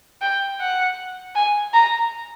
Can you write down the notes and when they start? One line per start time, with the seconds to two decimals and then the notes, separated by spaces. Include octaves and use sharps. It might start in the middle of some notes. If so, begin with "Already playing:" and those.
0.21 G5
0.60 F#5
1.35 G#5
1.74 A#5